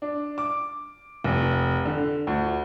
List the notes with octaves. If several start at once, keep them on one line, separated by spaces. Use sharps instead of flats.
D4
D6
F1
D3
D2